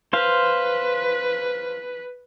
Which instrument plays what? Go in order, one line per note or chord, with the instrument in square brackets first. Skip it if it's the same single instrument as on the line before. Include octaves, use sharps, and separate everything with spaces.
[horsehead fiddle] B4 [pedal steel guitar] C5 F5